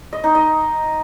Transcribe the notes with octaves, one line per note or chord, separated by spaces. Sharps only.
D#5
D#4
D#5